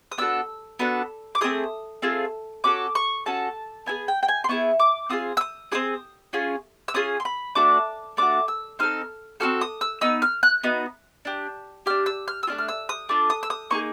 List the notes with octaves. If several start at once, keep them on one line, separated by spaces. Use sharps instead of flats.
D#6
B3 D4 F#4 A4 E6
B3 D4 F#4 A4
D6
A3 C4 F4 G#4 D#6
A3 C4 F4 G#4
C#4 F#4 A4 D6
C#6
C#4 F#4 A4 A5
B3 E4 G#4 G#5
G5
G5
G#5
C6
B3 E4 G#4 C#6
D6
C4 F4 G#4 D#6
E6
D#6
C4 F4 G#4 D#6
C#4 F4 G#4
E6
C#4 F4 G#4 D#6
C6
B5
A3 D4 F#4 D6
A3 D4 F#4 D6
E6
C4 D#4 A4 F6
C4 D#4 F#4 A4 F6
D#6
E6
B3 D#4 E6
F6
F#6
B3 D#4 F#4
D4 G4
D4 G4 F6
E6
F6
E6
A3 D4 F4 F6
F6
E6
D#6
A3 D4 F4 D6
D#6
E6
D#6
A#3 D#4 G#4 C#6